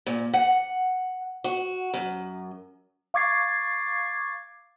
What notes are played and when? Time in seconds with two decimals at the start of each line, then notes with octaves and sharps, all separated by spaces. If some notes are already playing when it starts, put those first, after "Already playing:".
0.06 A#2
0.34 F#5
1.44 F#4
1.94 F#2
3.14 F5 C#6 D6 G#6 A6 C7